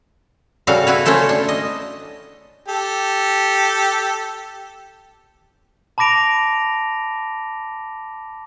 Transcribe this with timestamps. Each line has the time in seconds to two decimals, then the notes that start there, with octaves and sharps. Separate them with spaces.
0.67 C#3 G3 F#4 A4 F5
0.87 E4 F#4 B4 C#5
1.06 A3 C#4 E4 A4 C5
1.29 D4
1.49 D#5
2.68 G4 A4
5.98 A5 B5 D6 A#6 D7 F7